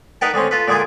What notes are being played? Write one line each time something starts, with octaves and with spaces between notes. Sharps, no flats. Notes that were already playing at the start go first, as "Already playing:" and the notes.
D#4 A#4 B4 F#5 G5 A5
D3 G#3 C4 C#4
F4 A4 B4
A#2 D3 G#3 G#4 D6 D#6